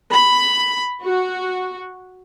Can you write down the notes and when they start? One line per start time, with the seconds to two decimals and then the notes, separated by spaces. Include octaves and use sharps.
0.11 B5
1.03 F#4